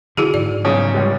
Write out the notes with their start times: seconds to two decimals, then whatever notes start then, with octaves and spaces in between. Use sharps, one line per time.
0.17 D3 F3 E4 F#4 G#4
0.34 G#2 D5
0.65 B1 C#3
0.94 C#2 G3